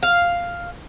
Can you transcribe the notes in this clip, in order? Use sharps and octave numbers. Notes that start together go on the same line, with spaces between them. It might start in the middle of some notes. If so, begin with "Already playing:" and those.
F5